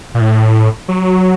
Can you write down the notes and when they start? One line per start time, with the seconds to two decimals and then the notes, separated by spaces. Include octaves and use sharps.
0.14 A#2
0.21 A2
0.88 F#3